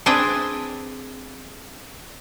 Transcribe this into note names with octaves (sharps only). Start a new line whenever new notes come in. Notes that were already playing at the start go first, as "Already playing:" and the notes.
C4 D4 G#4 B4 G5